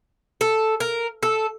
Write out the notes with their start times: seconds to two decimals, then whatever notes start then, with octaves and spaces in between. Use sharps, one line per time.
0.41 A4
0.80 A#4
1.23 A4